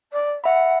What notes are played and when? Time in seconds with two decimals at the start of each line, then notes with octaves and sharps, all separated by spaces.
0.12 D5
0.44 E5 F#5 B5